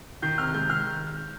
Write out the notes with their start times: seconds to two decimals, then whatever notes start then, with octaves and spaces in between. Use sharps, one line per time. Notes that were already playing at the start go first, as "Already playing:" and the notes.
0.22 D#3 G6
0.38 C3 F6
0.54 G#3 G6
0.70 D#3 F6